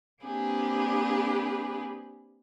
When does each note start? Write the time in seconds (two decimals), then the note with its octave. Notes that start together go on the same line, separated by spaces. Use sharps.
0.23 A#3 C4 D4 G4 G#4 B4